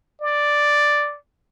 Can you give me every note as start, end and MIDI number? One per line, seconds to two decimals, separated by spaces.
0.21 1.17 74